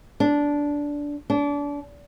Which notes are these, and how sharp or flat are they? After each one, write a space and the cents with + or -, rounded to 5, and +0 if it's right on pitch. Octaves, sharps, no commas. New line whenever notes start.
D4 -10
D4 -30